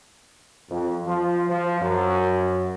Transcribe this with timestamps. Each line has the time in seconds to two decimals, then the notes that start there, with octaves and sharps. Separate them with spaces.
0.70 F2
1.06 F3
1.48 F3
1.81 F#2